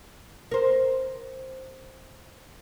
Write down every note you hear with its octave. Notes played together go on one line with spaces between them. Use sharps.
A#4 C5